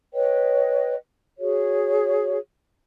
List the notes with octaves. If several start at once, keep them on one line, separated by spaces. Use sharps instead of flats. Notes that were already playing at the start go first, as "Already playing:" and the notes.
B4 C#5 D#5 G5
F#4 G#4 C#5